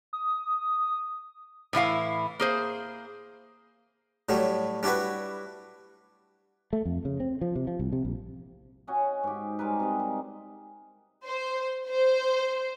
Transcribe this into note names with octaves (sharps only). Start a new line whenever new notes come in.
D#6
A2 E3 E4 F5
A#3 G#4 C5
A2 F#3 G3 A3
G3 D4 E4 F#4 B4
A3
F2
C#3
C4
F3
C3
F3
C2
C3
A#1
C#4 F#4 D#5 G#5
G#2 G4
G3 G#3 A#4 B4
C3 D#5
D#4
C5
C5